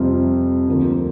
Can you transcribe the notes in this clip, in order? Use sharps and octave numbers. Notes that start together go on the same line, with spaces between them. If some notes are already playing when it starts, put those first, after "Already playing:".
Already playing: F2 C3 G3 C4 F4
D2 D3 F3 A#3